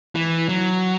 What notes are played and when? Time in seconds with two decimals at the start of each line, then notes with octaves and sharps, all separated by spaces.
0.15 E3
0.49 F#3